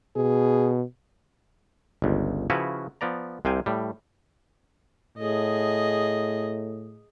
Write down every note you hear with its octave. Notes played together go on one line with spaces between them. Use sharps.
B2 G#4
G1 C#2
C#3 F3 E4 F#4 B4 C#5
F3 B3 D5 A#5
C2 C3 F5 G5 G#5
A2 G3
A2 G#4 D#5